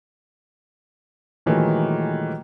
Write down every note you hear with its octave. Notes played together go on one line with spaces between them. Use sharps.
A#2 D#3 E3 F#3 G#3 A3